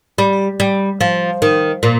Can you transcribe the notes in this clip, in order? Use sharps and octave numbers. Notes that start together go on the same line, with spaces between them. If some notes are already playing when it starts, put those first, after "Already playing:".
G3
G3
F3
D#3
A#2